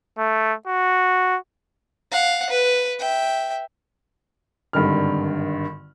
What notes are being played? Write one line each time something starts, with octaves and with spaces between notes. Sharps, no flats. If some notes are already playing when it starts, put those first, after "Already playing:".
A3
F#4
F5 F#5
B4
E5 G5
G#1 G2 D3 D#3 F6